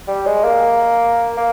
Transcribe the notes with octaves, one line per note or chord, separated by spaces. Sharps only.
G3
G#3
A#3
A#3